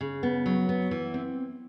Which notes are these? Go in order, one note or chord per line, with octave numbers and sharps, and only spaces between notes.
C#3
B3
F#3
B3
E3
C4